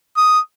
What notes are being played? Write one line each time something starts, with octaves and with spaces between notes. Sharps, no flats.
D#6